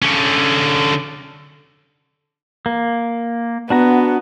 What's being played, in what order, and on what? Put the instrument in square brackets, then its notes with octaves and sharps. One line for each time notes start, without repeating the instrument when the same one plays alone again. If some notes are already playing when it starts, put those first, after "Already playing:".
[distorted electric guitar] D3 C#4
[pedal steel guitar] A#3
[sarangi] B3 [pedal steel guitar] D4 F#4 A#5